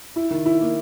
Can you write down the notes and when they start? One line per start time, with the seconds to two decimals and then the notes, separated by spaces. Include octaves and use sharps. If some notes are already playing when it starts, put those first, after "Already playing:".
0.16 E4
0.31 D#3
0.46 E4
0.61 A#3